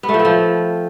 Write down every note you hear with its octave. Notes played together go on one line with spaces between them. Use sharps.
B3
A3
F3
C4
F3